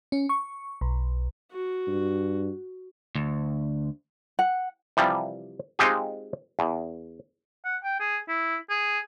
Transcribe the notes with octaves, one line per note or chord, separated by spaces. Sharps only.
C#4
C#6
B1
F#4
G2
D2
F#5
C3 E3 F3 G3
G#3 C4 D#4 F4 G4 G#4
E2
F#5
G5
G#4
E4
G#4